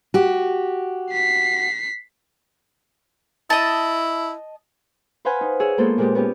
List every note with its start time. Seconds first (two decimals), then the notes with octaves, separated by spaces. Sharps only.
0.14 F#4 G4
1.12 B6 C7
3.50 E4 D#5 A5
5.25 B4 C5 F5 F#5 G#5 B5
5.41 D#4
5.60 G#4 C#5 E6
5.78 G#3 A#3 B3 F4 A4 C5
5.98 A#2 G#3 G4
6.15 B3 C#4 G4